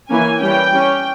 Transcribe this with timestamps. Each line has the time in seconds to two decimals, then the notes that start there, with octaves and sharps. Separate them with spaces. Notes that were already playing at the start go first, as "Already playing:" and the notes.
0.09 E3 A#3 C#4 G#5
0.40 E3 G3 C#4 G5
0.71 G3 C#4